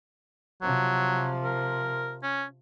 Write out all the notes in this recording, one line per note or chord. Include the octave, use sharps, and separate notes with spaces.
C3 F3 F#3
A#4
C#4